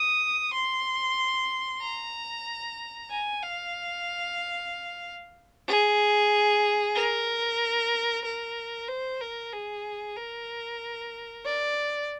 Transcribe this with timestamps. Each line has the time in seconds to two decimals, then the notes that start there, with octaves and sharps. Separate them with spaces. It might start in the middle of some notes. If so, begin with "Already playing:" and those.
Already playing: D#6
0.53 C6
1.82 A#5
3.11 G#5
3.43 F5
5.67 G#4
6.95 A#4
8.25 A#4
8.88 C5
9.21 A#4
9.53 G#4
10.17 A#4
11.46 D5